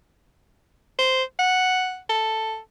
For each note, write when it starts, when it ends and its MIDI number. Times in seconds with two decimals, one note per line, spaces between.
0.98 1.23 72
1.39 1.99 78
2.09 2.59 69